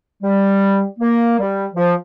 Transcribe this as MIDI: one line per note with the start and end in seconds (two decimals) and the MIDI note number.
0.23 0.84 55
0.99 1.39 58
1.39 1.66 55
1.74 1.94 53